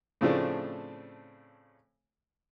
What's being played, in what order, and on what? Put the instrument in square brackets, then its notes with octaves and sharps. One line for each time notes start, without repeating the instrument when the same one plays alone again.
[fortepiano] A2 C#3 F3 A3 C4 D4